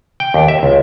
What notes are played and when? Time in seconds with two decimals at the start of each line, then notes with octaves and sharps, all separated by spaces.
0.20 G5
0.34 D#2
0.48 E5
0.63 C#2